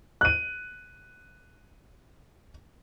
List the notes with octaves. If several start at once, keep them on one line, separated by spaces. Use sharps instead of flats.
F#6 D#7